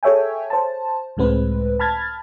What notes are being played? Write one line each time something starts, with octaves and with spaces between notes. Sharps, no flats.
G#4 A4 C#5 E5 G5 G#5
C5 A5
C#2 A2 G#3 C4 B4
A5 B5 F6 G#6 A6